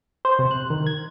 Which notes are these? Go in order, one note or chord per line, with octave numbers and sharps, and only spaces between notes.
C5
C3
F#6
D#3
G#6